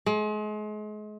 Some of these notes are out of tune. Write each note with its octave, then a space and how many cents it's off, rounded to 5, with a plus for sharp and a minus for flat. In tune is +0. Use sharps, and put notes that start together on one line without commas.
G#3 +35